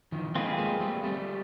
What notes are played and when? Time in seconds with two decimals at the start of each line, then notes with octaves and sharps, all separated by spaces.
0.12 D#3 F3
0.35 G#3 A#3 C4 F4 G#4 B4
0.58 G#3 A#3
0.80 G3 A3
1.04 G3 A3